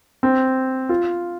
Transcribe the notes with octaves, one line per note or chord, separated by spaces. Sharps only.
C4
F4